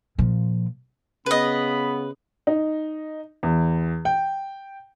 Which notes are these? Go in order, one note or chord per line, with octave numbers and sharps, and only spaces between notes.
A#2 F3
C#3 B3 B4 D#5 B5
D#4
E2
G5